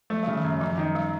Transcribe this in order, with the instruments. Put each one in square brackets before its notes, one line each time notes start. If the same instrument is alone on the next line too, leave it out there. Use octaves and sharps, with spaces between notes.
[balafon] F3 [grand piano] A3
[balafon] G3
[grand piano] C#3
[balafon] D#3
[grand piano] F#2
[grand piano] F#2 [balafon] F3
[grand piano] D#3 [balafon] F#3
[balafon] G3